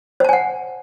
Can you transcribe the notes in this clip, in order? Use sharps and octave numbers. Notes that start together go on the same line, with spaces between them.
C5 F#5 G#5 A5